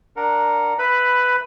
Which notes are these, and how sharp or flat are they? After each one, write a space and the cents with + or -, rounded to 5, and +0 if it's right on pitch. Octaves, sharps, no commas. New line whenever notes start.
D4 +0 A#4 +0 F#5 -15
B4 +10 E5 +0 B5 +0